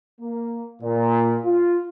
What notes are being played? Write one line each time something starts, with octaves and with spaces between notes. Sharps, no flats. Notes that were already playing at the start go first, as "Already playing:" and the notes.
A#3
A#2
F4